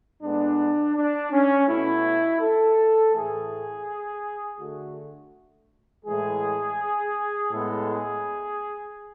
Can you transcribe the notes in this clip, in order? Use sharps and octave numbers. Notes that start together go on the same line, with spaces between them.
A2 G#3 B3 D4
D4
C#4
B2 A3 E4
A4
A2 E3 A3 G#4
D3 A3 F#4
A2 E3 G#3 G#4
A2 G#3 B3 A4
G#4